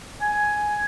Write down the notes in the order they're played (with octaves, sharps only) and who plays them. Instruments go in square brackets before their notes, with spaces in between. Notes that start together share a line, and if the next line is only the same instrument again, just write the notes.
[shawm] G#5